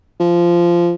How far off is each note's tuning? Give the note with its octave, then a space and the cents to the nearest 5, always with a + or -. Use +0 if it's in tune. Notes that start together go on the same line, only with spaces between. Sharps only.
F3 -15